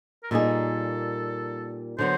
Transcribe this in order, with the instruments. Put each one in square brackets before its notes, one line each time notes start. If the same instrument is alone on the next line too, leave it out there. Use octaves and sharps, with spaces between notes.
[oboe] A#4
[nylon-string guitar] A#2 G3 A#3 D#4 G#4 [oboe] A4
[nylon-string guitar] D3 F#3 B3 [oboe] C5